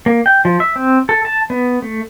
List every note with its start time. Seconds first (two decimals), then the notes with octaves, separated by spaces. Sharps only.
0.06 A#3
0.26 G5
0.45 F3
0.60 E5
0.76 C4
1.09 A4
1.25 A5
1.50 B3
1.82 A3